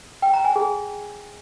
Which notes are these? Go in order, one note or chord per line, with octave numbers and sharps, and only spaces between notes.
G5
A#5
G#5
G#4